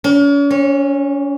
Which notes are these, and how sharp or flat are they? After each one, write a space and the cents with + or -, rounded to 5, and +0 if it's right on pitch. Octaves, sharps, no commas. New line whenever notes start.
C#4 +40
C#4 -20